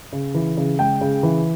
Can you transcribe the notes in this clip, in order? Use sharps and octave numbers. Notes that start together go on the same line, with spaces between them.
C#3
E3
C#3
G#3 G5
C#3
E3